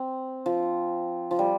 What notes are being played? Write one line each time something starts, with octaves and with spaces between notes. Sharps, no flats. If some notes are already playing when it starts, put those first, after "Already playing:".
Already playing: C4
F3
F3
G3